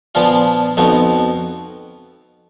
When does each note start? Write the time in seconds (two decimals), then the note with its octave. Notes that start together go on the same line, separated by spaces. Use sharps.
0.15 A#2 F3 B3 D4 F4
0.77 F2 F3 B3 D#4 F#4